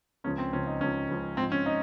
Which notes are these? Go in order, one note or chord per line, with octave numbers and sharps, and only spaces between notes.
C#2 C#3 F3 C#4
C4
C#2 C#3 F3 C#4
D#4
C#2 C#3 F3 C#4
C#2 C#3 F3
G#2 F3 C4
C#4
D#4